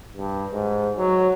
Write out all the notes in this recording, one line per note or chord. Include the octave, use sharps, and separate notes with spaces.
G2
G#2
F#3